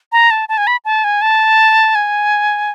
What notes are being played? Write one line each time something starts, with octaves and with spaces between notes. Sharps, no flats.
A#5
A5
A5
G#5
B5
A5
G#5
A5
G#5